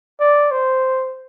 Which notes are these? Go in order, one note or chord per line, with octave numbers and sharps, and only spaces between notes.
D5
C5